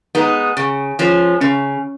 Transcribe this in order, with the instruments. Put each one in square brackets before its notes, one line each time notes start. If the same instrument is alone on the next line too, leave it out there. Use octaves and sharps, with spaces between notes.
[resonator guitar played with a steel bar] G#3 B3 D#4
C#3
F3 G#3 C#4
[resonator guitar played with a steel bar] C#3 [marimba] C#4